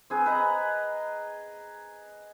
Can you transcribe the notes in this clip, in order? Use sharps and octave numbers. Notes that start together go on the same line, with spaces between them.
C4 G#4 B4
B4 D#5 A#5